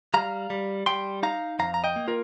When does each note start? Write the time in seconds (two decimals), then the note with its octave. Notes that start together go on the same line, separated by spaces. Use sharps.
0.14 G3 F5 A#5
0.50 G3
0.86 G3 G5 C6
1.23 D#4 F5 A#5
1.59 F2 F5 A#5
1.74 A#5
1.84 D#5 G5
1.96 A#3
2.08 F4 A#4